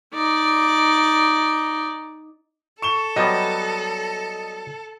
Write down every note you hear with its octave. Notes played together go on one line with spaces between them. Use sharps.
D#4 D5
A4 C#6 E7 G7
F#3 G3 B3 D#5